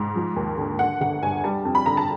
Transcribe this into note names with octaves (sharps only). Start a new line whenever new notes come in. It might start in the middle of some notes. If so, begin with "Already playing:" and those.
Already playing: G#2
F3
D#2
D3
D3 F#5
G1 F#5
G2 G#5
G3 A5
F2
B5
D3 A#5
A5